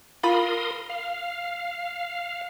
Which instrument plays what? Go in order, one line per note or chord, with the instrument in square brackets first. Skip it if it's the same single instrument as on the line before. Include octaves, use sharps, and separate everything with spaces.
[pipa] F4 B5 [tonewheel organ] A#4 C6 D#6
[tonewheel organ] F5